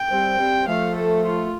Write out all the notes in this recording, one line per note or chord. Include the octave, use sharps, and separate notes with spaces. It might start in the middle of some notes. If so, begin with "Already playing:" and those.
Already playing: G5
G3 C4
G3 C4
F3 A3 F5
A4
F4